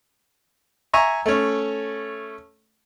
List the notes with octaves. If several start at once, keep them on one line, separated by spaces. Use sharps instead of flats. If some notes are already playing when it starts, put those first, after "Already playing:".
E5 G#5 A#5 C#6
A3 C#4